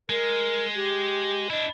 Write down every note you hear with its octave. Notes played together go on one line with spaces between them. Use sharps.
G#3 A#4
G4
D4 E4 D#5